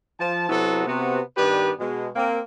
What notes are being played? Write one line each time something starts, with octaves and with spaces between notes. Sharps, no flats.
F3 A5
C3 F#3 B3 E4 F#4 A4
C3 B3 F#4
G2 D#3 B3 G4 B4 D5
B2 G#3
A#3 C4